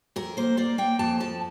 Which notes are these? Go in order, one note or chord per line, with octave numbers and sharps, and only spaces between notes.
F2 A#4
A#3 C5
A#3 D5
A#3 G5
F2 A5
F3 A5